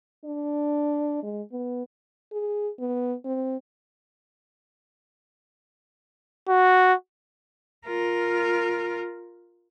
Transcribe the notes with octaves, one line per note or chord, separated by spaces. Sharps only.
D4
G#3
B3
G#4
B3
C4
F#4
F4 A#4